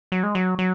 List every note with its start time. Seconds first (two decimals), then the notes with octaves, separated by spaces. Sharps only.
0.12 F#3
0.23 G#3
0.35 F#3
0.59 F#3